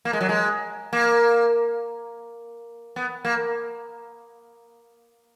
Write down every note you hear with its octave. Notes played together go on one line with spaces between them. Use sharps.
A#3
G#3
F#3
G#3
A#3
B3
A#3